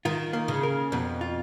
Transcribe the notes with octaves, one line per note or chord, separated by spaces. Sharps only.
D#3 F4
A#3
C#3
A#4
F2 B2
F4